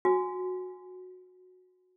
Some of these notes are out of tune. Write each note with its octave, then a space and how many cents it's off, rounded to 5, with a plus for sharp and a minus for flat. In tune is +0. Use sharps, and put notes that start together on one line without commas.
F#4 -15 G#5 +0